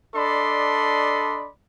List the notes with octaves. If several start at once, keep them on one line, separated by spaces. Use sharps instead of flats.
D4 A4 D5 D#5 B5 C6